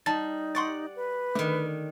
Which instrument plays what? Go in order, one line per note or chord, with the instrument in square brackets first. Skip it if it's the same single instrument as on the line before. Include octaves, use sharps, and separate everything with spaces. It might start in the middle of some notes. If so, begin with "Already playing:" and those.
[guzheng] G3 [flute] D#4 [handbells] A5 A6
[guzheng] D5 F#5 [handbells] C6 C#6 A6
[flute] B4
[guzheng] D3 D#3 [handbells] A3